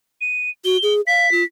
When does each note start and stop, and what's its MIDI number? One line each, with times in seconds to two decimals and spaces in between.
0.21 0.50 99
0.65 0.77 66
0.65 0.94 103
0.83 1.01 68
1.07 1.30 77
1.07 1.44 95
1.31 1.43 65